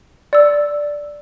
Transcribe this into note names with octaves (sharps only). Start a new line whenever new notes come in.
D5 E6